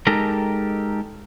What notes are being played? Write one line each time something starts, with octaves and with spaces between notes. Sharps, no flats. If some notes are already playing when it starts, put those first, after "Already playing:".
G#3 D#4 G4 A4 A#4